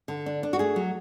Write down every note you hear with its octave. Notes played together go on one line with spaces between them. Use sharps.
D3
D4
D4
F#4
A3 G#4
F#3